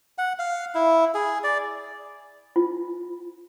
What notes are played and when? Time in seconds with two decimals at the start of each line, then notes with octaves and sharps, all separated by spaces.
0.18 F#5
0.39 F5
0.75 E4
1.15 G#4
1.43 D5
2.56 F4